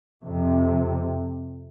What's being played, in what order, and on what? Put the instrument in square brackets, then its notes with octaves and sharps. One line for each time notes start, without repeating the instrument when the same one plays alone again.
[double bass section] F2 C3